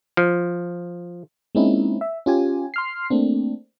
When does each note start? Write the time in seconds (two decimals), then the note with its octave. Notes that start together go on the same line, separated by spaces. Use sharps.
0.17 F3
1.55 G#3 A#3 C4 C#4 D#4 E4
2.01 E5
2.26 C#4 F4 G4 G#5
2.74 C6 F6 C7
3.10 A3 A#3 C4 D4